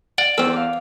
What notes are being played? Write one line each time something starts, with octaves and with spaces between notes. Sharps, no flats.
D5 F#5
E2 C4 A4 E6
F5 D6